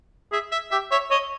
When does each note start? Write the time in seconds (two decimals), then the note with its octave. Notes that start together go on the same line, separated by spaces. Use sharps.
0.32 G#4 E5
0.52 E5
0.71 G4 E5
0.91 C#5 E5
1.11 C#5 D#5